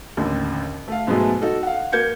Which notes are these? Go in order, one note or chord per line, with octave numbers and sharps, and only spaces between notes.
A1 D#2 D3
A3 F5
G#2 B2 F#3 G#3 A3
D#4 F#4 A4
F5 F#5
A#3 G6 G#6 C#7